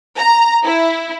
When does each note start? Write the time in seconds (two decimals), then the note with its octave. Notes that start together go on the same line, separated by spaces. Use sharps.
0.17 A#5
0.63 E4